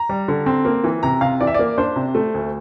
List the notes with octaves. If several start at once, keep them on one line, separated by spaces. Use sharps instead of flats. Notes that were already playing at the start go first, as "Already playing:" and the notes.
Already playing: A#5
G3
D3
C4
A#3
E3
C3 A#5
C3 F5
E3 D5
E5
A#3 D5
D4 C5
C3
A3
D2